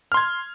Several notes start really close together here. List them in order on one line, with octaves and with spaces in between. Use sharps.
F6 C6 G#6